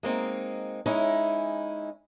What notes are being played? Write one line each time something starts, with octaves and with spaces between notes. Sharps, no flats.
G#3 A#3 C4 D#4
G#3 C#4 D#4 E4